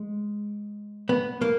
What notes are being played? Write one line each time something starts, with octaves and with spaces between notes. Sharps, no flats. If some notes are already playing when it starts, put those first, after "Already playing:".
Already playing: G#3
B3
A#3